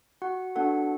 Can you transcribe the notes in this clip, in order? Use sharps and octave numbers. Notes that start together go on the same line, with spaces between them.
F#4 F#5
B3 D4 F#4 A4 F#5